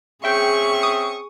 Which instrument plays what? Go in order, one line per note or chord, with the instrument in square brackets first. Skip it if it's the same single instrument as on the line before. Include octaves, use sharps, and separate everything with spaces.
[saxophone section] C4 C#4 E5 [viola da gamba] G#4 [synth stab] G5 [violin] C#6
[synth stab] D#6